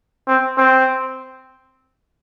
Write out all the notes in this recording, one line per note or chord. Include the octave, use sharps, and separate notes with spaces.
C4
C4